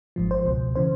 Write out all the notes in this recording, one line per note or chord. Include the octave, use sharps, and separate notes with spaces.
G#1 G#2 F3
C5
C#2 B2
C#3 E3 C5